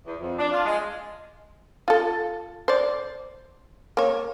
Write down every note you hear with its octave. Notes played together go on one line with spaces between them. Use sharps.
E2
F2
D4
F4
G#3
F4 A4
C5 D5
A#3 C#5